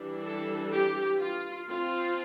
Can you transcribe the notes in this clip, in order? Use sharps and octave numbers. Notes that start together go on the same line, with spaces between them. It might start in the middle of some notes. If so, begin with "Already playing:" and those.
Already playing: E3 G3 D4
A4
G4
F4
F3 C4 F4